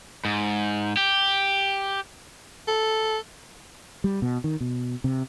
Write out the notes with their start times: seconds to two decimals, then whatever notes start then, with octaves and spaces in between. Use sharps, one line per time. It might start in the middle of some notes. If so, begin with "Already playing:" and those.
0.25 G#2
0.97 G4
2.68 A4
4.04 G3
4.22 B2
4.44 D#3
4.60 B2
5.04 C3